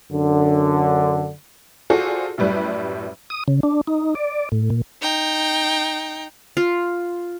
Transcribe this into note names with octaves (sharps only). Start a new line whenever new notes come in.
F#2 D3
F4 F#4 G#4 A4 C5 D5
F#2 A2 G3 B4
D#6
C#3
D4
D#4
D5
A2
A#2
D#4 G5
F4